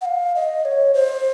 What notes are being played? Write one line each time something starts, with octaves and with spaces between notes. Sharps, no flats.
F#5
F5
D#5
C#5
C5